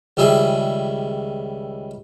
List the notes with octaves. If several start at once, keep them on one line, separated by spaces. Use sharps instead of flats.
C#2 D#3 G3 G#4 E5